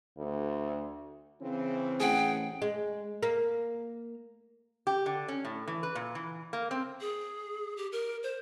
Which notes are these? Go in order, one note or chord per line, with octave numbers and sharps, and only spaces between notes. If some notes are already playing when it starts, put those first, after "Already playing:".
D2
C#3 E3 C4
A1 G#4 F#5 G5
G#3
A#3
G4
D3
C#4
A2
E3
B4
A#2
E3
A#3
C4
G#4
G4
A#4
C5